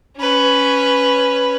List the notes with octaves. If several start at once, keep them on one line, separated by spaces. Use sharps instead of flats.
C#4 B4